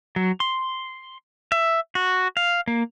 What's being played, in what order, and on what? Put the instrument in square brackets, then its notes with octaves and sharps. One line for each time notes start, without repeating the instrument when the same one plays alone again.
[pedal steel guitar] F#3
C6
E5
F#4
F5
A#3